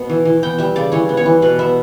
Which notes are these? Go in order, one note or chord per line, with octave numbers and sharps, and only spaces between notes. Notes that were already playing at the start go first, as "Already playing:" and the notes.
Already playing: B2 B3
E3
E3
B3 G5
G3 E5
C#3 D5
E3 C#5
B3
C#5
E3
B2 B4
B3 E5